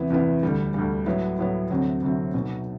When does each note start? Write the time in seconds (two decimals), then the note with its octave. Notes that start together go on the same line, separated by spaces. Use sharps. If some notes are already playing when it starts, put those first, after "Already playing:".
Already playing: E2 C3 E3 B3 E4
0.10 E2 C3 E3 B3 E4
0.43 D2 D3 G3
0.74 D2 D3 G3
1.06 A2 F#3 B3 E4
1.39 A2 F#3 B3 E4
1.70 D2 C3 F#3 C4
2.02 D2 C3 F#3 C4
2.34 B1 B2 F#3